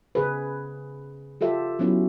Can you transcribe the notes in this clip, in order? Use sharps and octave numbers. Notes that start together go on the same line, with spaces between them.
C#3 G#4 B4
F4 G4 A4 E5
F#3 B3 C#4 E4